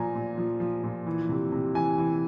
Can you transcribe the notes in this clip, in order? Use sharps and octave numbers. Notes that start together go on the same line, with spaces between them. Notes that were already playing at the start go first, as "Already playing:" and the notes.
Already playing: A#2 F3 G#5 A#5
A#2
F3
F3
A#2
E3
C3
C3
E3 G#5
E3